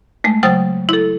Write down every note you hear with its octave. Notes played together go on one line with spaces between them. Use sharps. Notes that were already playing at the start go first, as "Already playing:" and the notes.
G#3 A3
C#3 F#3 C5 G5 D#6 A6
E4 A4